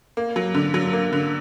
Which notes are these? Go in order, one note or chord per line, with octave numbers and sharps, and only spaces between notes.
A#3
F#3
D3
F#3
A#3
D3